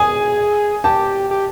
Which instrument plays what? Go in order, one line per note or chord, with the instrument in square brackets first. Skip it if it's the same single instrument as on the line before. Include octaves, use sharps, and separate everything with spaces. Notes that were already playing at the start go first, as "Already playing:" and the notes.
Already playing: [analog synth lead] G#4 [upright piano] G#5
[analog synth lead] G4 [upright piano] A5
[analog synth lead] G4